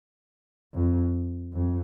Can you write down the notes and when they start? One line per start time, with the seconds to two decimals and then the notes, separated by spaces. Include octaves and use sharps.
0.74 F2
1.53 F2